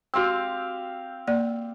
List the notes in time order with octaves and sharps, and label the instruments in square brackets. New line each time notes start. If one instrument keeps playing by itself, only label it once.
[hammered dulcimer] C4 G4 F5 [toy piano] F#4 C6 E6
[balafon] A#3 D5